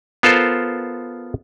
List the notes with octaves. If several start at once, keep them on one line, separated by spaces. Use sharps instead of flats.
B3 F4 A4 A#4 C5